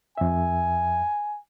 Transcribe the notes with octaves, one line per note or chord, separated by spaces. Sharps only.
F2 E5 G#5